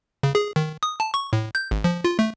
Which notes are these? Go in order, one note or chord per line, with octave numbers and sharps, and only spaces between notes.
C#3
G#4
D#3
D#6
A5
C#6
A2
G6
G#1
F3
F4
A3